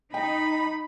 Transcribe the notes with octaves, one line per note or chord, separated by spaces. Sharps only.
D#4 G5 B5